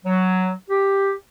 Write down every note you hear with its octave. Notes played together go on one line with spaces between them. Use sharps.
F#3
G4